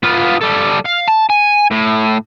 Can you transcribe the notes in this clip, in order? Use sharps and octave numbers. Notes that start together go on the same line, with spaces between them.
B3 F4
G3 A4
F5
A5
G#5
A2